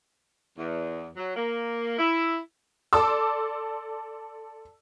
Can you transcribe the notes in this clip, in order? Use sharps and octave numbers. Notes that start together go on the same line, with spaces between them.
E2
F#3
A#3
E4
A4 D5 A5 C6 D6 E6